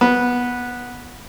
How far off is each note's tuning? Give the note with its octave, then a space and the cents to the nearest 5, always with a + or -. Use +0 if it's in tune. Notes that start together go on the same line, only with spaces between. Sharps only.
B3 -10